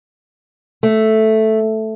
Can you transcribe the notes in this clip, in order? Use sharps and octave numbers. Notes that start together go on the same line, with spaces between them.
A3